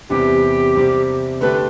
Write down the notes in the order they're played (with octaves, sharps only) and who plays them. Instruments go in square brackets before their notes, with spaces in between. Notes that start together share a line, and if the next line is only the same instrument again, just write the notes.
[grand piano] E2 C3 G3 B3 [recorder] G4
[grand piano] C3 G3 C4
[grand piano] D3 A3 D4 G4 [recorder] B4